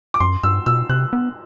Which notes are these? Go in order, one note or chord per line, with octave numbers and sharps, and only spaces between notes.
D6
F#2 C6
G2 E6
B2 E6
C3 F#6
B3